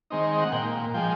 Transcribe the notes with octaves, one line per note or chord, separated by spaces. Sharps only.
D#3 G#3 C4 D#4
F#5
A#2 G5
F3 G#3 G5